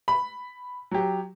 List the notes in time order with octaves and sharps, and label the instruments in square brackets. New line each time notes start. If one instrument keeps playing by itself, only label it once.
[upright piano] B5
F#3 G4